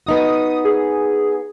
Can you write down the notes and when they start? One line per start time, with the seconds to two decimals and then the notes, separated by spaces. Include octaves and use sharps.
0.06 B3 D#4 F#4 D#6
0.65 G#4